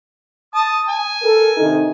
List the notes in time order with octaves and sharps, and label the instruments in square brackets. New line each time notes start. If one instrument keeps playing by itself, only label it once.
[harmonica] A5 D#6
G#5
[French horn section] A4 A#4
C3 D#3 D#4